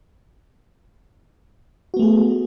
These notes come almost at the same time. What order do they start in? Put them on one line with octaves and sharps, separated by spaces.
F#4 B3 A3 G#4